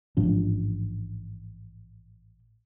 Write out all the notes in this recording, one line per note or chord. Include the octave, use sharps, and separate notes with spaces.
A1 G#2 F3 D4